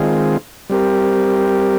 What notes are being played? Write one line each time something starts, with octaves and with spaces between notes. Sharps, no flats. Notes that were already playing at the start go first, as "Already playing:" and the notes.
Already playing: D#3 G#3 C4 F4 G#4
G3 C4 G4 A#4